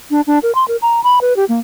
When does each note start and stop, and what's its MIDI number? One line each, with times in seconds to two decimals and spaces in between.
0.11 0.21 62
0.27 0.39 62
0.43 0.54 70
0.55 0.66 84
0.68 0.77 70
0.82 1.03 82
1.04 1.19 83
1.21 1.36 71
1.37 1.45 67
1.49 1.60 58